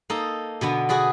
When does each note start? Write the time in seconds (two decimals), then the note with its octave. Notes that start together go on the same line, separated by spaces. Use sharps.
0.10 A#3 D#4 A4
0.61 B2 D3 B3
0.89 F#4 G#4 B4 D5